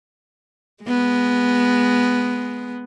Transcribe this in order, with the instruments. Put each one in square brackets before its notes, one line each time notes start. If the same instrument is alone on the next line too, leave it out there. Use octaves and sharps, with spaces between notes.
[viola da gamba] G#3 B3